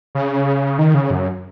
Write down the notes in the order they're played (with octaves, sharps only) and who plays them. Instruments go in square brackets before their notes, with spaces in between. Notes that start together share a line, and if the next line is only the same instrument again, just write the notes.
[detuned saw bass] C#3
D#3
C#3
F#2